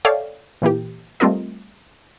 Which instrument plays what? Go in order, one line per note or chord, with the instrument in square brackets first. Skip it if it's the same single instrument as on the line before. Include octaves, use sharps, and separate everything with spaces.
[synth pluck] A4 C#5 D5 E5 F5 G5
A#2 E3 A#3 G4
G3 A3 C4 F4 A#4 D#5